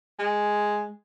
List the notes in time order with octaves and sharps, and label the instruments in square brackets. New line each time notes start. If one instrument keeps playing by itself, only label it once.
[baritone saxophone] G#3